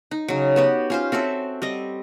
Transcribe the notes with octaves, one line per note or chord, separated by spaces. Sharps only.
D#4
C#3 F#3
B3 F#4 G4
C#4 F4 C5
C4 F#4 A4 E5
G3 C4 D#5